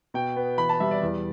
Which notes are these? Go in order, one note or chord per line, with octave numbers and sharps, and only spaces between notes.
B2 G5
B3
E3 B5
A5
G3 E5
D5
E2